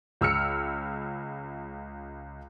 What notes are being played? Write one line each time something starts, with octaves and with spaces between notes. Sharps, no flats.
C#2 E6 F6 C#7